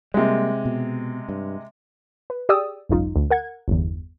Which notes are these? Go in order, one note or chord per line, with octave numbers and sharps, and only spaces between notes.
C3 G3 G#3 A#3
B2
G2
B4
G4 G#4 D5 G5 D#6 E6
G#1 C#2 F#2 D#4 F4
D2
A#4 F#5 G#6
G1 E2